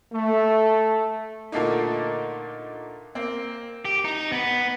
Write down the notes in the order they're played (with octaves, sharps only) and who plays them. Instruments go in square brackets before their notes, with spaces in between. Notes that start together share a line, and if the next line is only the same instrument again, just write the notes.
[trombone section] A3
[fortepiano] A#2 D3 A3 A#3 D#4
A#3 C4
[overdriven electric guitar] G4
D#4
B3